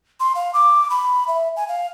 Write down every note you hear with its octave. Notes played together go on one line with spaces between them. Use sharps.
C6
F5
D6
B5
E5
G#5
F5